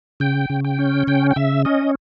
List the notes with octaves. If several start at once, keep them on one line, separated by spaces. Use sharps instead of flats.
C#3 G5
C#3
G5
C#4
C#3 G5
G5
C#3 E5
C#4 D#5